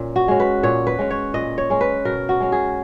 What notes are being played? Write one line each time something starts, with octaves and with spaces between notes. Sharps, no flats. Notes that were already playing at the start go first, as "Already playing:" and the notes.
Already playing: A#2 C#4
F#4
G#3 C#4
B4
A#2 C#5
B4
G#3 C#4
C#5
A#2 D#5
C#5
G#3 C#4
B4
B2 A#4
F#4
G#3 C#4
G#4